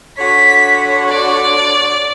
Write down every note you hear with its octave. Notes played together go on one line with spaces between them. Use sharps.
D3 F#4 C#5 B6
D5